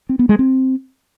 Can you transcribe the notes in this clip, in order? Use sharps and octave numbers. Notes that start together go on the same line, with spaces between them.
C4
B3
G#3
C4